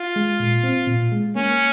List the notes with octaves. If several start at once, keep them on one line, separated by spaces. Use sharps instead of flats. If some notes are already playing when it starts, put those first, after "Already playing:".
Already playing: F4
G#3
A#2
C4
A#2
G#3
A#3 C#4